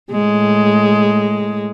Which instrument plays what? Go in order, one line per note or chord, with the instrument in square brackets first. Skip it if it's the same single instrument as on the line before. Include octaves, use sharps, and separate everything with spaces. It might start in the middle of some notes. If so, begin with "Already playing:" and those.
[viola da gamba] A2 G#3